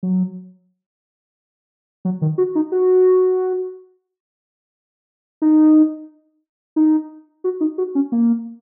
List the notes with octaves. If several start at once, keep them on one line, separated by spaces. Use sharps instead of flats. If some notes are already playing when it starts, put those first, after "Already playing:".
F#3
F#3
D#3
F#4
D#4
F#4
D#4
D#4
F#4
D#4
F#4
C#4
A#3